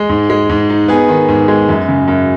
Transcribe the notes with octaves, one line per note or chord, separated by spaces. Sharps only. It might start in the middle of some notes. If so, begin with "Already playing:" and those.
Already playing: G#3
G#2
G#3
G#2
D#4
B3 G#4
D#3
G#2
G#3
F#2
C#3
F#2